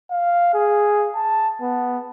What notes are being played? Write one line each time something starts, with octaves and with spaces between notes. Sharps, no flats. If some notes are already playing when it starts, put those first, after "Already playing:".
F5
G#4
A5
B3